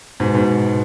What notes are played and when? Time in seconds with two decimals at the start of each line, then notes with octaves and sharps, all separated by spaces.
0.20 G#2 B2
0.34 G#2 B2